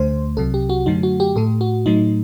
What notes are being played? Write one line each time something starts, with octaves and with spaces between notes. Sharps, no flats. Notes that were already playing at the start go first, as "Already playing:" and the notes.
Already playing: D2 D3 A3 C5
C2 C3 F#3 A4
G4
F#4
F#2 D3 F#3 A3 D#4
F#4
G4
A2 A3 A4
F#4
A2 F#3 A3 D#4